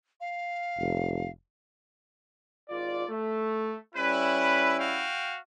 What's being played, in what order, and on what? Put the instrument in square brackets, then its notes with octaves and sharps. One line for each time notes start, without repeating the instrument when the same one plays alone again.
[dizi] F5
[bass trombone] F1
[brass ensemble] G#1 F4 D5
A3
[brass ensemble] G3 C#4 E4 [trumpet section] B4
[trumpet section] F#4 F5 G5